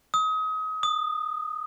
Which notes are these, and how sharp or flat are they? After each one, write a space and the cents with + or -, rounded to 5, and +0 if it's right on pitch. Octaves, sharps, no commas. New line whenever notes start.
D#6 +30
D#6 -20